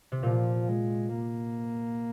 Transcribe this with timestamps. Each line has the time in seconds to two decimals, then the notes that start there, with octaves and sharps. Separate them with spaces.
0.12 C3
0.23 A#2 F3
0.69 G#3
1.14 A#3